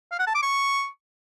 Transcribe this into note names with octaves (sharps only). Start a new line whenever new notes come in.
F5
F#5
A5
D6
C#6